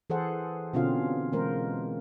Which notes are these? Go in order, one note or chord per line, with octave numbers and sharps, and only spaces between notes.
E3 G#4 A4 C5 F#5
B2 D3 C4 C#4 F4 F5
E3 G#3 A#3 A#4 C5